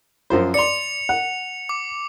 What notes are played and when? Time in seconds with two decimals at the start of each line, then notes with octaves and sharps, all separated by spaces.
0.30 F#2 F3 C5
0.54 D5 C6 C#7 F7
1.09 F#5
1.69 D6